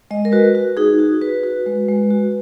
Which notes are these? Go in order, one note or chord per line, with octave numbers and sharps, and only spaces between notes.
G#3 D#5
A#4
F#4 B4
F#4
D#4 G#4
F#4
F#4 B4
F#4
G#3
G#3
F#4